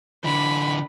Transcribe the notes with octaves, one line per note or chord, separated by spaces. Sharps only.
D3 E3 B5